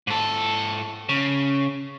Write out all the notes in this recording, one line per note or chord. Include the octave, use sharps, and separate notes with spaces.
G#2 A4
C#3